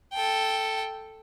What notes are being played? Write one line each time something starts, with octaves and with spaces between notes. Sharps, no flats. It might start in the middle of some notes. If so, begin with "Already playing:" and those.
A4 G5